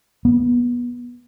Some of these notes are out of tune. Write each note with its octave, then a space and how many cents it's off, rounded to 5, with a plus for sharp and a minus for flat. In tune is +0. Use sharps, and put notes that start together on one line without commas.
B3 -25